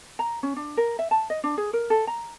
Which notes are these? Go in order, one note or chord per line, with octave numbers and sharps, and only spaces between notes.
A#5
C#4
D4
A#4
E5
A5
D#5
D4
G#4
A#4
A4
A#5